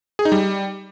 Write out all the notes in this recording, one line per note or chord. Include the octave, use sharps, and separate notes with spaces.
G#4
D#4
G3